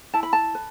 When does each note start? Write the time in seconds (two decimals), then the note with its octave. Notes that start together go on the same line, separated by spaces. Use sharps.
0.14 E4 A5
0.23 B5
0.33 A5
0.55 B4